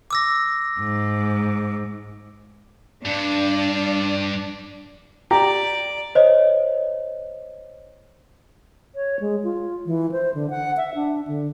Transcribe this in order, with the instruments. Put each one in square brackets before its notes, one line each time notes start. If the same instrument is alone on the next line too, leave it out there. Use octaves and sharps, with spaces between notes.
[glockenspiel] D6 E6 A#6
[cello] G#2
[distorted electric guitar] G2 [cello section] D4
[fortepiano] G4 [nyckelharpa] D5 [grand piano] A#5
[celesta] C5 C#5 D#5
[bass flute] C#5
G#3
F4
E3
C5
D3
F#5
E5
D4
D3